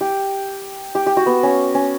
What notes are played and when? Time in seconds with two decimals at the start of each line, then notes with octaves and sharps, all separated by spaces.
0.01 G4
0.95 G4
1.06 G4
1.17 F#4
1.26 B3
1.43 C#4
1.75 C#4